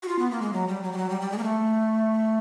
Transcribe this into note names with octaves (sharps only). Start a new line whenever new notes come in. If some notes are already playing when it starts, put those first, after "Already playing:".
F#4
F4
B3
A#3
G#3
F#3
G3
F#3
G3
F#3
G3
G3
G#3
A#3
A3